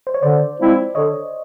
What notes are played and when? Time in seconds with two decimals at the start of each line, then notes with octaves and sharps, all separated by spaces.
0.07 C5
0.14 C#5
0.22 D3 C5 D5
0.60 F3 G#3 C4 E4
0.95 D3 C#5 D#5